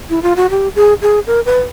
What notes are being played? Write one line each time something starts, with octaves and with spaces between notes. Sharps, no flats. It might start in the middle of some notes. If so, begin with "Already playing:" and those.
E4
F4
F#4
G4
G#4
G#4
A#4
B4